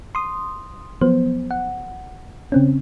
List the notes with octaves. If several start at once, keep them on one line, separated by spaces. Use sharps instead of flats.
C6 D#6
F3 F#3 B3 C5
F#5
C#3 C4 C#4